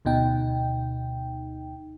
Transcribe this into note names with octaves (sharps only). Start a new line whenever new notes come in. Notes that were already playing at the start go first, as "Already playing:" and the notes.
D2 B2 D#4 G5